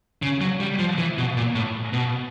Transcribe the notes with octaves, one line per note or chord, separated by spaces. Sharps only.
C#3
F#3
G3
F3
E3
B2
A#2
A2
B2